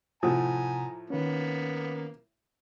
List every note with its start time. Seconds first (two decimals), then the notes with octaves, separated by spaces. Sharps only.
0.23 A2 C3 F3 F#5 G#5 A#5 D#6
1.10 D#3 A#3 B3 C#4